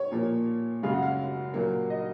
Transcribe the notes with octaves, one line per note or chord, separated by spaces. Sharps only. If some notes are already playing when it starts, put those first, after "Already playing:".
Already playing: C#5
A#2 F3 A#3
F#2 C#3 G#3 F5
F#5
F5
A#2 F#3 A#3
D#5